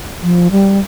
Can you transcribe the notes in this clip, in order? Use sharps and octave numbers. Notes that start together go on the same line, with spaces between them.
F3
G3